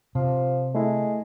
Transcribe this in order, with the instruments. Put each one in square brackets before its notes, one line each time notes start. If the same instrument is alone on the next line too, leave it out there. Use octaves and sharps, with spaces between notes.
[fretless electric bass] C3 [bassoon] F3
[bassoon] G#3 [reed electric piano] A3 E4